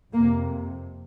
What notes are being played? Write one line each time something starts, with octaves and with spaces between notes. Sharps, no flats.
F2 C3 A#3